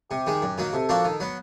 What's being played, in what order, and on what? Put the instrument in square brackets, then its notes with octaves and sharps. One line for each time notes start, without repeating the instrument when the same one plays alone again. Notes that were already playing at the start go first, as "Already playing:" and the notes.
[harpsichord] C3 [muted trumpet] G4
[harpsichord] D#3 G#3
F#2
D#3 F#3 A#3
[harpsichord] C3 [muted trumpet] A4
[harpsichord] F3 A#3 D4 F#4
D#3
F#3 B3